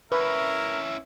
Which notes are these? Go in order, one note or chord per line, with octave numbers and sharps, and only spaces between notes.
C#4 E4 A#4 B4 E5